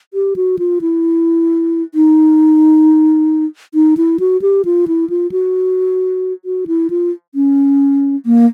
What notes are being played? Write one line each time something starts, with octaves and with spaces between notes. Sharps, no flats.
G4
F#4
F4
E4
D#4
D#4
E4
F#4
G4
F4
E4
F4
F#4
F#4
E4
F4
C#4
A#3